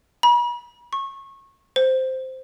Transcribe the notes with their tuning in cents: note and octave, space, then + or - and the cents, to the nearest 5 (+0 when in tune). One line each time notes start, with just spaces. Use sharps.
B5 -45
C#6 -25
C5 -5